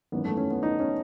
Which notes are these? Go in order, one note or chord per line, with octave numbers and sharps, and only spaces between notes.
G#1 F#2 E3 B3
A3
C#4
B3
D#4
C#4